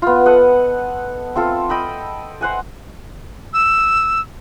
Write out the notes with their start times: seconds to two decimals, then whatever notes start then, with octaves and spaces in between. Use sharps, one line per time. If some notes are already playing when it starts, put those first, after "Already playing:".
0.02 B3 F4
0.26 A4 D#5 F#5
1.36 C4 F4 A4
1.69 D#5 G5 B5 E6
2.41 C5 F#5 G#5
3.53 E6